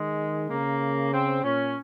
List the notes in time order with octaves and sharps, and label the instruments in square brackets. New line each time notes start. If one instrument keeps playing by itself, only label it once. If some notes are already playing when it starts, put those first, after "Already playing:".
Already playing: [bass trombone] D#3 [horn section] G#3
[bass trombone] C#3 [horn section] A#3
[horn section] C4
[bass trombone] A#2 [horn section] C#4